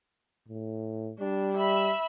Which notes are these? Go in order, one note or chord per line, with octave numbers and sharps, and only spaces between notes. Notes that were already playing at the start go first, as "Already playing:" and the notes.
A2
G3 D4
E5 B5